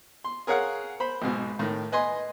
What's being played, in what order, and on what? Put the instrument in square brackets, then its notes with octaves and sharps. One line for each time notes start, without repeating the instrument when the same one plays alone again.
[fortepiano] C6
G#4 A#4 C#5 F5 F#5
C5 B5
B1 G#2 B2
A2 D#3
B4 D#5 G#5 C6